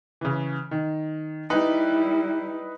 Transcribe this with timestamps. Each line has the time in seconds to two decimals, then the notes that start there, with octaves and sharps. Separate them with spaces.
0.21 C#3 E3
0.71 D#3
1.50 G3 D#4 E4 B4